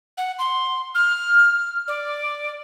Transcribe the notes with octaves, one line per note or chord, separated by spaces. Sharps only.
F#5
C6
F6
D5